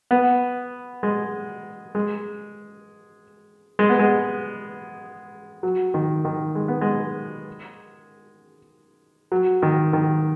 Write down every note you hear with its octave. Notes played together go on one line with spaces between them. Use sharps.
B3
G#3
G#3
G#3
B3
G#3
F#3
D#3
D#3
G#3
B3
G#3
F#3
D#3
D#3